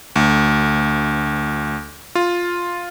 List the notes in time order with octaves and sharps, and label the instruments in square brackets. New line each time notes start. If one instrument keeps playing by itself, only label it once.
[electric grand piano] D2
F4